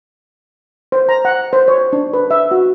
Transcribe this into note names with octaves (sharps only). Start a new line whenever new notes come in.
C5
A#5
F#5
C5
C#5
D4
B4
E5
F#4